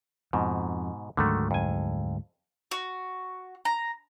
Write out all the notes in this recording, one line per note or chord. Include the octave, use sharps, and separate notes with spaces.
F2 G#2 B2
D2 G#2 D3 D#3 F#3 A3
F2 G#5
F#4
A#5